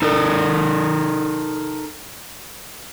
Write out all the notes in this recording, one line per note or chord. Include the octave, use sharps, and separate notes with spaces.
D#4 A4 A#4